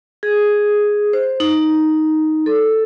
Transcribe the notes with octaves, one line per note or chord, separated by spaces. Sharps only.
G#4
C5
D#4
A4